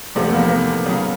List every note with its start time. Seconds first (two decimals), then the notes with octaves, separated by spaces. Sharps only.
0.15 E2 C3 F3 A3
0.28 B3
0.33 A#3
0.45 A#3
0.51 B3
0.86 C#3 F#3 B3